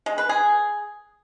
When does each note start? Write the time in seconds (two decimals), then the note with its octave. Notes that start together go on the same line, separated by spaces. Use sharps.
0.06 G#3
0.18 B4
0.29 G#4